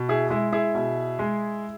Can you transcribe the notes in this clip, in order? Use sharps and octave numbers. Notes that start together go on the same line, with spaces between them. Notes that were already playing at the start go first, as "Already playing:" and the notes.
Already playing: B2
E4 G#4
G#3 E4
E4 G#4
B2
G#3